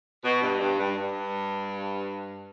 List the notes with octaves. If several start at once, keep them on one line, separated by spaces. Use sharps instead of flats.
B2
G2
G2
G2
G2